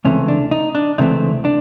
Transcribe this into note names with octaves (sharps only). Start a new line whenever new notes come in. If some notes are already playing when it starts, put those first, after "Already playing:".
C#2 C3 E3 A3 C4 C#4
D4
D#4
D4
C#2 C3 E3 A3 C4 D#4
D4